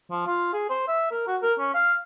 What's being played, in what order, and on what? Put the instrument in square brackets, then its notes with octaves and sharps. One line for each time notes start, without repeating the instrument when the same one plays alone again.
[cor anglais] F3
F4
G#4
C5
E5
A#4
F#4
A#4
C#4
F5